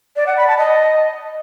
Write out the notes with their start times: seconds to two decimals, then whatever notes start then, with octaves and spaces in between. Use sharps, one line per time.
0.16 D5
0.27 F#5
0.37 B5
0.47 A5
0.58 D#5